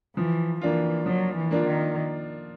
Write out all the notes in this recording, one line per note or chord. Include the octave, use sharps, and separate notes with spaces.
E3 F3
E3 A#3 D4 F4
F3 F#3
E3
A#3 D4 F4
D#3